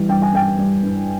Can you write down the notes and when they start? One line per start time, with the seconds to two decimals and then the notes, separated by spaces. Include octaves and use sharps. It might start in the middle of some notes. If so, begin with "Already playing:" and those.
Already playing: E3 G3
0.09 G2 G5
0.22 G#5
0.33 G2 G5
0.59 G3
0.83 G2